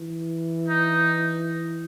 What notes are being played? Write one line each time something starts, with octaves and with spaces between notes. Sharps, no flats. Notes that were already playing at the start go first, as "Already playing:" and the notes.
Already playing: E3
D#4